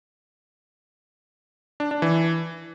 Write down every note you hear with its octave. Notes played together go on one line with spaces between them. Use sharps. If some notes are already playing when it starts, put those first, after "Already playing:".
D4
D4
E3